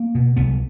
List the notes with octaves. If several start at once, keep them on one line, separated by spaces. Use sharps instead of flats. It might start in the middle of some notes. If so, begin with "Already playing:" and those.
Already playing: A#3
B2
C2 B3